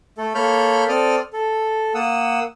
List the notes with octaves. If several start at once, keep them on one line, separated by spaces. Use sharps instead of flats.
A3 A4
A#3 A4 C#5 B5 F6 G6
C4 A4 D5 D#6 F6
A4
A#3 F#5 D#6 E6